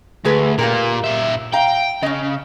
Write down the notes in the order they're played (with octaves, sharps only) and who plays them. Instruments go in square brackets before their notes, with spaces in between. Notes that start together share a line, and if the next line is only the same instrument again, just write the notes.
[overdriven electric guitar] D2 [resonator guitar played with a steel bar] G#3 G#4 B4
[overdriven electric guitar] A#2 [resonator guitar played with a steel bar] F4 G4 A#4
[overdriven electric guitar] A#2 E5
[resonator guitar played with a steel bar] F5 A#5 [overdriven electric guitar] G5
[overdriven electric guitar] C#3 [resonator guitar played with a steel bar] C#4 D#5